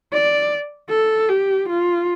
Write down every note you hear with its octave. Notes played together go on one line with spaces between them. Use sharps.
D5
A4
G4
F4